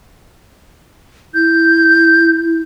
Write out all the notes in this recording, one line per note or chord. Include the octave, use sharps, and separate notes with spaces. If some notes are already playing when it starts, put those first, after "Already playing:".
E4 G6